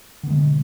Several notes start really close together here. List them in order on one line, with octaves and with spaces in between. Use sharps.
D3 B3 G#3 B2